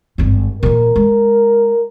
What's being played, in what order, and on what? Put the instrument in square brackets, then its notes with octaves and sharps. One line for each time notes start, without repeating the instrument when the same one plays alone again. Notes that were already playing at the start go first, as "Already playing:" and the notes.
[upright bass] G#1 G2
[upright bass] A#2 F3 [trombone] A#4
[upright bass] G#3